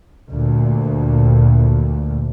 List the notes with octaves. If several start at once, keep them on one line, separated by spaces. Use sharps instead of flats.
D2 A#2